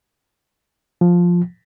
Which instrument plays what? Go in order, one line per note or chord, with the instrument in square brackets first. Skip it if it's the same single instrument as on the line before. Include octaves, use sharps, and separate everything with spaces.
[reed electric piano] F3